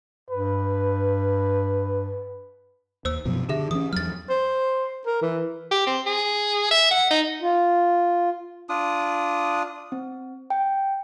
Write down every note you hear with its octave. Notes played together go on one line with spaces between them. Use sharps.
G2 B4
D#2 C5 E6
F#2 B2 F3
D3 G4 G#4 E5
E3 G#3 C#4 D#6
E2 F#3 F6 A6
C5
A#4
E3
G4
C4
G#4
E5
F#5
D#4
F4
D4 F4 D#6
C4
G5